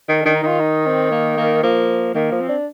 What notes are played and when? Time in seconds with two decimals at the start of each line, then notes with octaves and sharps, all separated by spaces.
0.09 D#3 A#4
0.21 D#3 D4
0.34 D#4
0.43 D#3 F4
0.61 D#4
0.86 C4
1.11 A#3
1.37 A#3
1.63 F3 A#3
2.15 D#3 A#3
2.32 F3
2.41 C4
2.49 D4